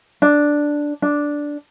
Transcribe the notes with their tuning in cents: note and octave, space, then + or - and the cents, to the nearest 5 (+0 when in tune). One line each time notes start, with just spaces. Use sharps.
D4 +0
D4 -5